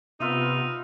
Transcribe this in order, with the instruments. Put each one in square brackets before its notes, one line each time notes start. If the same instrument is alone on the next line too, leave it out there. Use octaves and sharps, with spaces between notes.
[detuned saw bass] C3 [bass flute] B3 [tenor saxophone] D#4 [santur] F4 E5 E6